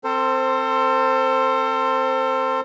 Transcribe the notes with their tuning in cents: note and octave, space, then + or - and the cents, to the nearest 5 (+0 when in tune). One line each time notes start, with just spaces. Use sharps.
C4 +0 A4 +35 C5 +5